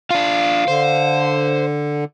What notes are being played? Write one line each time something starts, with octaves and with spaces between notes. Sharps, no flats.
D4 F4 F5
D3 C5